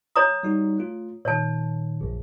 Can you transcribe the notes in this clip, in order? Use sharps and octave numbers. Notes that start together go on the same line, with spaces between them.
C#5 A#5 D#6
G3 D#4 F#4
A3 F4
A#2 D#3 C#5 A5
A#1 F#2